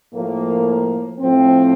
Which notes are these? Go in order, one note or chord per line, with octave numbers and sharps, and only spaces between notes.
A2 F3 A#3
A2 F3 C4